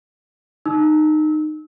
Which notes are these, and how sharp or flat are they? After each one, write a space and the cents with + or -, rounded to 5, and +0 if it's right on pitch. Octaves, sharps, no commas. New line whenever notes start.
D#4 -20 E6 -25